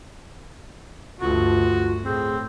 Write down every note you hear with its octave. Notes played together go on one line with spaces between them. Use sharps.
D2 G2 F4 F#4
A2 C4 G#4